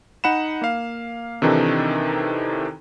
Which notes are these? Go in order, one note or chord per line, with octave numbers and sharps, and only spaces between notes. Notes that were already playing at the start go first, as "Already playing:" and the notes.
D#4 F#5 B5 E7
A#3 F5
C3 D#3 E3 D4 D#4 A4